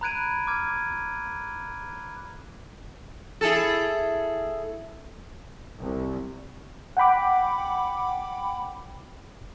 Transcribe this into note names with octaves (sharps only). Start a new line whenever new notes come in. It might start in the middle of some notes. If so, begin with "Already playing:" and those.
A#5 B5 F#6 G#6 D7 D#7
D6 F6 G#6
E4 G#4 A4
C2
F#5 G5 B5 D6